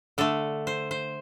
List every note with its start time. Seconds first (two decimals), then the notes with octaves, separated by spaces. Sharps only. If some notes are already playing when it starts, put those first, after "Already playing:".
0.18 D3 A3 A4
0.67 C5
0.91 C5